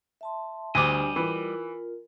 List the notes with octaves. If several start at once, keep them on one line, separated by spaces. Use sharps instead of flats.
E5 A5 C6
D2 G3 D4 G4 D#5 G#5 D6
E3 F4 A#4